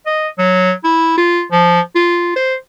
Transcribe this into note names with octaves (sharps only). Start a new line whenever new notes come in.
D#5
F#3
E4
F4
F3
F4
C5